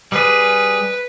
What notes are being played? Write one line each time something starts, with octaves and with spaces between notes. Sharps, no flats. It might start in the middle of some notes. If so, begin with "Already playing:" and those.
G3 G#4 B4